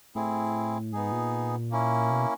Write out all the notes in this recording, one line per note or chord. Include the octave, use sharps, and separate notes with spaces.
A2 C4 E4 G#4
G#2 B3 D#4 G#4
A#2
A#3 C#4 E4
B2